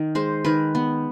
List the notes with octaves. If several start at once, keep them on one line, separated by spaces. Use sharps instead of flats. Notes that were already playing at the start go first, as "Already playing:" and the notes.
Already playing: D#3
G#3 C5
D#3 B4
B3